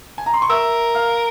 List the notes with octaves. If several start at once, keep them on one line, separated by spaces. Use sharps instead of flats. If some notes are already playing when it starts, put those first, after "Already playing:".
G#5
A#5
C6
C#6
A#4 E5 E6
F5 F6